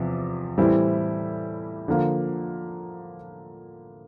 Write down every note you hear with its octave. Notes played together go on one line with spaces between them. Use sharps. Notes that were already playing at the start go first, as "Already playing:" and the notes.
Already playing: E2 C3 F3
A2 E3 G3 C4 E4
D3 F3 A#3 F4